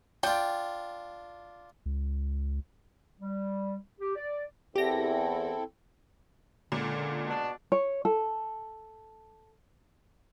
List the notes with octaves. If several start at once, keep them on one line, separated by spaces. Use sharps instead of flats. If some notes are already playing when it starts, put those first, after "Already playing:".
D4 F4 G5
C#2
G3
G4
D5
E2 C4 E4 G4 A4 A#6
C#2 A#2 D3
B2 D4
C#5
A4